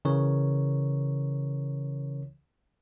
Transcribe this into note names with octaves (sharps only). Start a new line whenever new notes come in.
C#3 E3 A#4 C#5